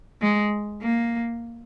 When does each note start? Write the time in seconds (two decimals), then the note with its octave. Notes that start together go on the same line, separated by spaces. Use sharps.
0.22 G#3
0.82 A#3